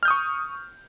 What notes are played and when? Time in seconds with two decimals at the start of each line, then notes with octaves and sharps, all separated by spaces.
0.03 F6
0.05 G6
0.08 D#6
0.10 C#6